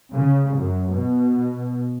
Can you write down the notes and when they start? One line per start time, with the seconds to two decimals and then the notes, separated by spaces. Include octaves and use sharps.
0.13 C#3
0.57 F#2
0.92 B2